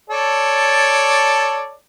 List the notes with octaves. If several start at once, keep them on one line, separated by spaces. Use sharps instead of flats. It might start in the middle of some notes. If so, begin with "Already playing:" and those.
A4 C#5 D5